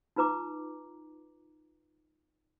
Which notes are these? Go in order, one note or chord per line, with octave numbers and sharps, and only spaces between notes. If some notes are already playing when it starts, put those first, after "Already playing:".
D#4 F4 B4 A#5 D6